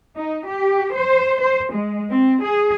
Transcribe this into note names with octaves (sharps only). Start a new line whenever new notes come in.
D#4
G4
C5
C5
G#3
C4
G#4